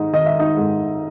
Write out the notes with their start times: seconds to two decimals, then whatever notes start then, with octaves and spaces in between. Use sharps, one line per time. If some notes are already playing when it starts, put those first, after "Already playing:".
Already playing: G#2 D#3 D#4
0.13 D#3 D#5
0.26 E5
0.39 D#4 D#5
0.57 G#2